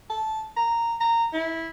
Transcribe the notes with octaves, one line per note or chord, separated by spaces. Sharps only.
A5
A#5
A#5
E4